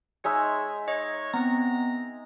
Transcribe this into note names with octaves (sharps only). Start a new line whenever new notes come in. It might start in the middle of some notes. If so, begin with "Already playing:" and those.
G#3 D#4 C#5 E5
C#5 D#5
B3 C4 A#5